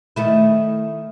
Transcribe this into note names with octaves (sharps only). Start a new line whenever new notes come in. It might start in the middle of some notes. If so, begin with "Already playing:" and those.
D#3 A3 E4